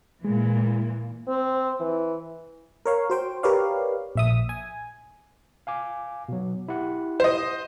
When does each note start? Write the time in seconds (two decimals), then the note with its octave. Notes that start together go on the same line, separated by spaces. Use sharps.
0.25 A#2 E3 G#3
1.28 C4
1.80 E3
2.86 A#4 C#5 F5
3.10 F#4 C5 G5
3.43 G4 A#4 B4 C#5 D5 F5
4.16 A#1 E5 D#6
4.49 G#5
5.67 F5 G#5 D6
6.29 B2 F#3
6.68 E4 G4 F#5
7.20 C5 D#5